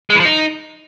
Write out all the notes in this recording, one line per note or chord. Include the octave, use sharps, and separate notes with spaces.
G#3
E3
F3
D#4